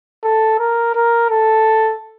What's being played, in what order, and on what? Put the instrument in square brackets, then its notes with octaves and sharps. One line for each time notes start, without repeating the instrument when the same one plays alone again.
[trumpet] A4
A#4
A#4
A4